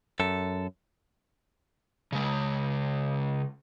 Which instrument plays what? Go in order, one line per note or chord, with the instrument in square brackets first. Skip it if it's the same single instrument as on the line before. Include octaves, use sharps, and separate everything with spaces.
[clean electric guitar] F#2 A4
[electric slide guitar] C#3 G#3